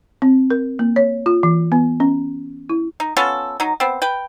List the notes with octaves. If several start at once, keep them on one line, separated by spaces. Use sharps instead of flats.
C4
A#4
A#3
C#5
F4
E3
B3
C#4
E4
D#4
B3 C#4 F4 A4
F#3 D#4
B3 C4
B4 G5